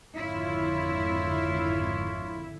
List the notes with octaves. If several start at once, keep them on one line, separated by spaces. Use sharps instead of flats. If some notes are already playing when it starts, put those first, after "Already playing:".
G#1 F2 D3 E4 F4 C#5